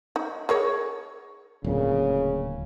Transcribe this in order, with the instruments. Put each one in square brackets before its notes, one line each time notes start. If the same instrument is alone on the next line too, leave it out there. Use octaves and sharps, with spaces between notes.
[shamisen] D#4
G#4 A#4 C#5
[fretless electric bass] D1 D2 A#2 [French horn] C#3